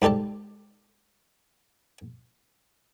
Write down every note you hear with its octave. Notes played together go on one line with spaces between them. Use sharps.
G#2 G4 A4 D5 A5